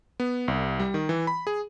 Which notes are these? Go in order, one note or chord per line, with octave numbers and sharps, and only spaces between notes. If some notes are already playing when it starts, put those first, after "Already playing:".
B3
C2
G3
D#3
E3
B5
G#4